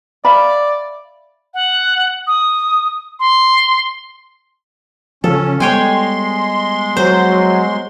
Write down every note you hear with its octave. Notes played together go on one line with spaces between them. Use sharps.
D5 E5 F5 B5
F#5
D#6
C6
C#3 F3 C#4 A4
G3 G#3 B3 C#5 G5 G#5 C6
F#3 C5